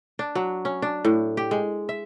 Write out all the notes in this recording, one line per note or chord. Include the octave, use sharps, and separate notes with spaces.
D4
F#3
C#4
D4
A2
G4
G#3
E5